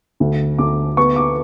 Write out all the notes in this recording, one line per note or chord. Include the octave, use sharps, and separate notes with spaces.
D2
D2 D6
B3 C#6
D6